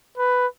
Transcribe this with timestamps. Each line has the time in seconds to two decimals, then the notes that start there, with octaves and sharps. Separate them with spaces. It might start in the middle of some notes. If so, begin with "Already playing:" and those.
0.17 B4